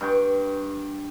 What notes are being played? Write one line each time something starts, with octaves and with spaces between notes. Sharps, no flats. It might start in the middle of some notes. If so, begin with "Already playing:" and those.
G2 G5 C#6